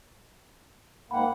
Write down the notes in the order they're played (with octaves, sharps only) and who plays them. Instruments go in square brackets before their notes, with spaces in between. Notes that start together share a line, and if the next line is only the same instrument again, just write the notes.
[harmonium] G#2 A#3 [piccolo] F#5 [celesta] G5 B5